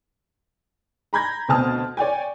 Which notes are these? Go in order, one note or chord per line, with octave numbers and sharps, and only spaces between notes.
A#5 B5 G6 G#6 A#6
D2 B2 C4 A5 D#6 F6
C#5 D5 G5 G#5